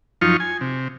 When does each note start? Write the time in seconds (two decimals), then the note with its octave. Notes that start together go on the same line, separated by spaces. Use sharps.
0.21 F#2 F3 D#4 F4 C#6
0.40 G#5
0.61 C3